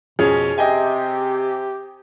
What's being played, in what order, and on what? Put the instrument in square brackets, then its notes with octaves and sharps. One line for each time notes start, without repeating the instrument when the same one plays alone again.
[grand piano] F2 C#4 [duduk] B2 [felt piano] G#4
[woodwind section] C3 [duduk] G4 [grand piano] D#5 G5 G#5